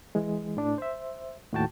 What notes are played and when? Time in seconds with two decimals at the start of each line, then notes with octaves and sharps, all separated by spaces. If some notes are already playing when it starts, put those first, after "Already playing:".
0.15 E3 G#3
0.57 A2 D4
0.78 C5 E5
1.53 D#2 A2 F#4 G5 A5